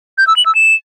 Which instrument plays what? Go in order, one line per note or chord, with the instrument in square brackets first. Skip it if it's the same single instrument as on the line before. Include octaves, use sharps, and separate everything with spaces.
[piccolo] G6
E6
F#7
E6
E7